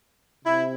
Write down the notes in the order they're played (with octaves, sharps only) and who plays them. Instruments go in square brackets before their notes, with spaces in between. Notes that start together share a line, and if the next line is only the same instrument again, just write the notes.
[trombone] C3 [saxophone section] E4